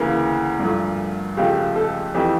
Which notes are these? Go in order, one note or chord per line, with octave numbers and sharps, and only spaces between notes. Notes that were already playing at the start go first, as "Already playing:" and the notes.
Already playing: D2 C#3 E3 A#3 A#4
G2 F3 A3
C#2 C#3 F3 A3 G4
A4
F2 E3 A3 G4